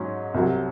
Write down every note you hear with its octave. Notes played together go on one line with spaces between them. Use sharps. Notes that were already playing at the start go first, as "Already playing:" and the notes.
Already playing: G#2 F#3 C#4
C2 C3 F#3